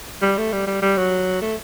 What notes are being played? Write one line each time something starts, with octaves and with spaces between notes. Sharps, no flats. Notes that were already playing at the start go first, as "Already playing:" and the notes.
G3
A3
G3
G3
G3
F#3
A3